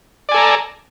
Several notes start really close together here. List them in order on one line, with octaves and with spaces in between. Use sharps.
D5 G#5 A4 A#5